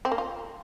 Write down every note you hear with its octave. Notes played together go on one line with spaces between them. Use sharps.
C4
A#3
F4